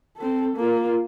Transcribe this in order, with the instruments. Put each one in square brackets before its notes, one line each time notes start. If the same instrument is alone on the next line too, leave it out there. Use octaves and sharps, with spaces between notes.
[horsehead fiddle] C4 A4
A#3 F4